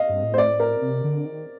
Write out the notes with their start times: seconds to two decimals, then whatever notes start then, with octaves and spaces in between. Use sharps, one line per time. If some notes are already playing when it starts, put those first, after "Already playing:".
Already playing: D#5 F5
0.09 G2
0.23 A2
0.34 C5
0.38 D5
0.60 A#4
0.82 C3
1.04 D3
1.26 D#3